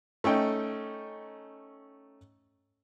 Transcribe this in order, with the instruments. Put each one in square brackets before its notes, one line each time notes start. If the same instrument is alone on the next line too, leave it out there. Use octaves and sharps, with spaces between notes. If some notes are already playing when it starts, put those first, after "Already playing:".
[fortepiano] A3 C#4 D#4 G5